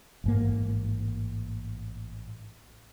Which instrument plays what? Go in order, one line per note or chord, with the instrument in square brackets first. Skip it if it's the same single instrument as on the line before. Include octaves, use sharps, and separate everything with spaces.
[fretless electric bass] A1 G#2 A#3